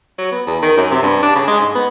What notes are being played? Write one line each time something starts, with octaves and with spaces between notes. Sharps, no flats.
F#3
B3
E2
D#3
F#2
C3
G2
D4
C#3
G#3
G#2
B3